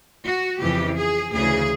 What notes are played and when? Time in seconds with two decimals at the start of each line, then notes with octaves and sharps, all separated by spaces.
0.25 F#4
0.61 F2 C#3 E3 G4
0.97 G#4
1.33 D2 C#3 E3 G#4